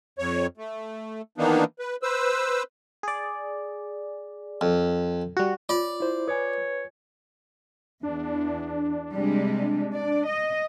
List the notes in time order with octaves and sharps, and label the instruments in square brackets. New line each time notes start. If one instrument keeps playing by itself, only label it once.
[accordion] F2 C#5
A3
D#3 E3 A#3 B3 D4 D#4
B4
B4 C5 E6
[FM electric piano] G#4 D5
[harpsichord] F2
[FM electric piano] G3 F#4
[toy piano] F4 C#5 [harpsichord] D5
[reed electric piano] E4 C5
[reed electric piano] B4 [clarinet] C#5 [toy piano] G#5 D#6
[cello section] E2 [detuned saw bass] D4
[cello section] C3 G3 G#3
D5
D#5